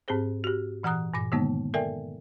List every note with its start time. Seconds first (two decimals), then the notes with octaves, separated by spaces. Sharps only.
0.08 G#2 C4 G4 G#4 C5
0.44 F#4 G4
0.83 A#2 E3 F#5 A#5 D#6 F#6
1.14 G2 A#2 D6 A#6
1.32 D3 D#3 G#3 A#3 B3 D#4
1.74 A4 A#4 D5 E5 G5 G#5